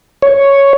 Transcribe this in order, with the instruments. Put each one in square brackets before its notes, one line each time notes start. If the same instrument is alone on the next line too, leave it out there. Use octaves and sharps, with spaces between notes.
[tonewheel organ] C#5